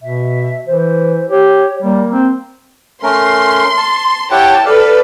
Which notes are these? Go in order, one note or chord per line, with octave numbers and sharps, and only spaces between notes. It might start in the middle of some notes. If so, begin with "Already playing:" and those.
B2 E5
E3 C5
G4 C#5
G3 A#3
C4
A3 C#4 A#4 C6
A5
E4 G4 C#5 F#5 G5 A5
A4 B4 D5 F5